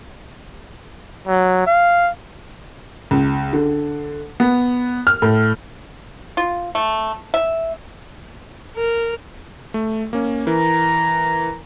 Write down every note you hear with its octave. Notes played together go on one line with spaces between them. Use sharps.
F#3
F5
C#2
D3
B3
F6
A2
F4
A3
E5
A#4
A3
A#3 C#4
E3 A#4 A#5